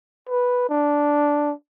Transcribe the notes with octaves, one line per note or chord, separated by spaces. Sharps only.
B4
D4